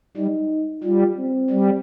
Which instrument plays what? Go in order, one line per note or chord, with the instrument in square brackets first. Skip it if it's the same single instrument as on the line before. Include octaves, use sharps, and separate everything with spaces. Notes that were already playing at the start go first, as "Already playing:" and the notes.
[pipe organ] G3 [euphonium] D#4
[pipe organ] G3 [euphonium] F4
[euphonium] C4
[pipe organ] G3